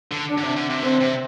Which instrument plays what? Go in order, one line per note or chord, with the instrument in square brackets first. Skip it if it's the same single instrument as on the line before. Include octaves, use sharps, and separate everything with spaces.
[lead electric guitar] D3
[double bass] D4
[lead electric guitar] D3
C3
D3
C3
[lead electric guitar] D3 [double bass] C4
[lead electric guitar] C3